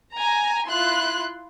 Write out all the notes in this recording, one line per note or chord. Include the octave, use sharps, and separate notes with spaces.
G#5 A#5
E4 F4 C6 F#6